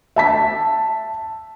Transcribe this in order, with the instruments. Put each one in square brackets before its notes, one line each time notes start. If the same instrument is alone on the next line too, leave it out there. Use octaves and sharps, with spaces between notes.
[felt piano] E5 A5 B6